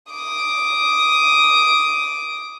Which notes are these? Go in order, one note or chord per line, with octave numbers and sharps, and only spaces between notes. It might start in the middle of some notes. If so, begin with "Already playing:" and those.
D6 D#6